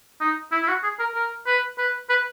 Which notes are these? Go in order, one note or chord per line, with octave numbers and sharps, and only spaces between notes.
D#4
E4
E4
F#4
G#4
A#4
A#4
B4
B4
B4